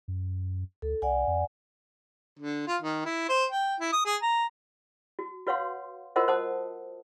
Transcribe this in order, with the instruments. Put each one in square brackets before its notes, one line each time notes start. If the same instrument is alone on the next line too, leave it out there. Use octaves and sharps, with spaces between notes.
[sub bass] F#2
[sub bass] D2 [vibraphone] A4
[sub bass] C2 [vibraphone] D5 F#5 G#5
[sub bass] F2
[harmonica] D3
F4
D#3
E4
C5
G5
E4
D#6
G#4
A#5
[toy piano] F#4
F#4 B4 C#5 F5 F#5 C6
F4 F#4 A#4 C5 D#5 F#5
C5 F#5 A5 D#6